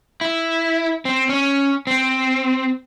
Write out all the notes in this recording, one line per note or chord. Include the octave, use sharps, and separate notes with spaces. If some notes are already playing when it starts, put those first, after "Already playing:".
E4
C4
C#4
C4